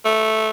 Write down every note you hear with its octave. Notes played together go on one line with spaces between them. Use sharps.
A3